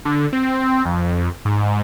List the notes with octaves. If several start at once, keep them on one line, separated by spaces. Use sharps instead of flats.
D3
C4
F2
G#2